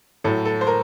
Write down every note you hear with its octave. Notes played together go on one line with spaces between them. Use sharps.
A2 F#3 A4
A4
C5
A#4